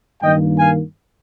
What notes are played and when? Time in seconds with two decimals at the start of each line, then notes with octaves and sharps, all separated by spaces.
0.22 G2 D#3 A#3 D#5 G5
0.59 F5 G#5